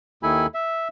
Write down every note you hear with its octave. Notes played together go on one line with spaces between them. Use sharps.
D#2 D#3 E4 A4 G#5 B5
E5